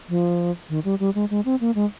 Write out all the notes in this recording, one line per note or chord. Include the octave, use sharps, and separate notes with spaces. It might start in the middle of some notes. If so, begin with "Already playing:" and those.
F3
D#3
G3
G3
G#3
G#3
C4
A#3
G#3